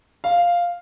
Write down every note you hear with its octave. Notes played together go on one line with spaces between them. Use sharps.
F5